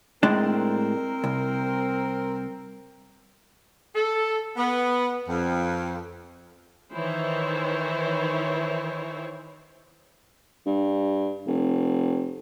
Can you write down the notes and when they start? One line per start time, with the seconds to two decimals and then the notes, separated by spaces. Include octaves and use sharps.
0.23 A2 G#3 C4 D4 A#4
1.24 C2
3.94 A4
4.57 B3
5.28 F2
6.94 D#3 E3 E4 C5 C#5
10.66 G2
11.47 F1